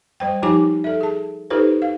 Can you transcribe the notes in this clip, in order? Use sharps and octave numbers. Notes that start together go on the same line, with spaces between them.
G3 C5 G5
F3 D#4 F4 G4 G#5 D6
A4 E5
G#4 A5
D#4 F4 G4 A4 B4 C5
F5